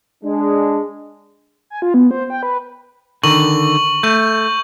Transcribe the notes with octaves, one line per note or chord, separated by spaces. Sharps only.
G#3 D4
G#5
F4
B3
C5
G5
B4
D3 D#3 C#6 F#7
A3 C#6 G6